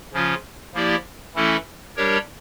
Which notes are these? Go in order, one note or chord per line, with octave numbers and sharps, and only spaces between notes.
C#3 F3 C#4 F4
F3 A#3 E4 G4 D5
E3 A3 C#4 E4 A4
G3 D4 G4 A#4 C#5